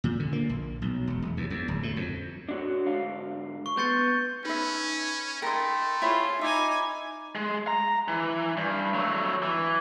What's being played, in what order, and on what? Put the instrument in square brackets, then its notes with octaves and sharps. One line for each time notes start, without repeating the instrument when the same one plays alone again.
[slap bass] A#2
D3
A#3
A#1
B1
E1
E1
D#2
E2
D1
A2
F2
[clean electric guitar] D4 F#4 C#5
G#2 D3 F5
[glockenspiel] C#6
[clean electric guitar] B3 C6 [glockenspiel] G6 A6 C#7
[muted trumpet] C#4 [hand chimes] D#4 [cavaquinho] B4 E5
[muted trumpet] A3 [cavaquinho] A#4 D#5 [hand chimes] G5 B5 C6
[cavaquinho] E4 G#4 C#5 [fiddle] F4
[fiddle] D#4 G#5 [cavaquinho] E5 [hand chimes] B5 D6 G#6
[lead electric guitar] G#3
A#5
E3
G2
F#3 A3
E3